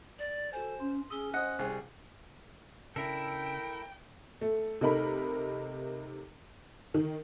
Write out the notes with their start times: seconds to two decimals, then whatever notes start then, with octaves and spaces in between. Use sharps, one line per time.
0.19 D5
0.53 F#4 A4 C5 G#5
0.80 C#4 C6
1.10 C#4 G#4 D#6 E6 G7
1.34 C5 D#5 F#5 D#6 F#6
1.59 C2 G#4
2.96 C#3 D4 E4 A4 A#4 G5
4.41 A3
4.81 C3 A3 D#4 A#4 B5
6.94 D#3